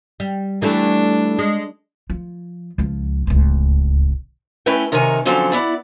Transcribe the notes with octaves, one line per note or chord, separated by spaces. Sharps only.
G3
E3 G3 A3 D4
G#3
F3
C#2 F3
D1 C#2
A3 C#4 E4 B4 G5
C3 D#3 A#4 C#5 G#5
D3 F3 F#3 C4 C#4 A4
B3 E4 D5